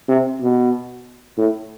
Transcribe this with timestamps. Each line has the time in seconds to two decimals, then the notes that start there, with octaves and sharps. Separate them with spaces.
0.09 C3
0.42 B2
1.38 A2